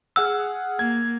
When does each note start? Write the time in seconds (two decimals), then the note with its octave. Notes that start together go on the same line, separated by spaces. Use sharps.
0.16 G#4 F#5 E6 F6
0.79 A#3 G#6